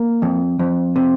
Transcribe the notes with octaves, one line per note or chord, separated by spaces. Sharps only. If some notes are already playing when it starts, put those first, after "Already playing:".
Already playing: A#3
F2
F2
C3